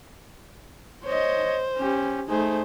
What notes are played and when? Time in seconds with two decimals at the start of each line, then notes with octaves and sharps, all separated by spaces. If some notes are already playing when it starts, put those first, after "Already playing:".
1.04 C5 C#5 D#5
1.77 C#4 G4
2.29 A3 D#4 G#4 C5